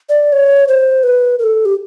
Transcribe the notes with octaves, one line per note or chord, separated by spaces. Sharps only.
D5
C#5
C5
B4
A#4
A4
G4